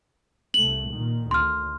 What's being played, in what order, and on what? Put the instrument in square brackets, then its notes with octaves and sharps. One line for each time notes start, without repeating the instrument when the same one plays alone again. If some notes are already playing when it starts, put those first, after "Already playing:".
[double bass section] C2 A3 [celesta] F#7
[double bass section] A#2 D#3
[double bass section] D2 [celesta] C6 F6